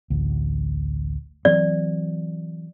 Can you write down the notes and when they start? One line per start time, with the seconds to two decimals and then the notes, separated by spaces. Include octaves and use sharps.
0.10 A1 D2
1.45 E3 F#3 C4 D5